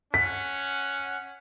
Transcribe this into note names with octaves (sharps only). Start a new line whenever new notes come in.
C#4 F#5 B6